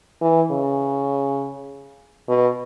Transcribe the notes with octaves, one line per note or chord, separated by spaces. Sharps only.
E3
C#3
B2